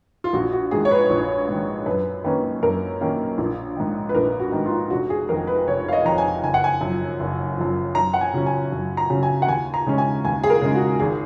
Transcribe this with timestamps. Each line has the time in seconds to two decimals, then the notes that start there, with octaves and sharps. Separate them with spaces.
0.24 F4
0.33 A#1 F#4
0.53 F#4
0.71 G#2 D#3 G#4
0.85 C#5
0.91 B4
1.10 A#1
1.49 G#2 D#3
1.86 F#2 B4
2.24 D#3 A#3 C#4 B4
2.63 F#2 A#4
3.01 D#3 A#3 C#4
3.38 A#1
3.76 G#2 D#3
4.09 B4
4.15 A#1 A#4
4.40 F#4
4.52 G#2 D#3
4.66 F4
4.90 F1 F#4
5.10 G#4
5.29 F2 D#3 A#4
5.47 B4
5.67 F1 C#5
5.88 F5
5.93 D#5
6.05 F2 D#3 A#5
6.18 G#5
6.44 F#1 G#5
6.54 F#5
6.64 G#5
6.81 F#2 F3
7.20 F#1
7.57 F#2 F3
7.95 F#2 A#5
8.14 F#5
8.21 G#5
8.34 C#3 F#3 C#4
8.46 G#5
8.72 F#2
8.97 A#5
9.10 C#3 F#3 C#4
9.23 G#5
9.42 F#5
9.47 D#2 G#5
9.74 A#5
9.86 C#3 G#3 C#4
9.98 G#5
10.25 D#2 G#5
10.44 G#4
10.50 A#4
10.62 C#3 G#3 C#4
10.75 F#4
11.00 G#1 G#4